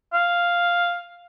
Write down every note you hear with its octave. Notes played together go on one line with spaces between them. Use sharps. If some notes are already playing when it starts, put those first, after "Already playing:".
F5